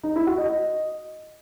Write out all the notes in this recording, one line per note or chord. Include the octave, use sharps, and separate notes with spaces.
D#4
E4
F#4
D#5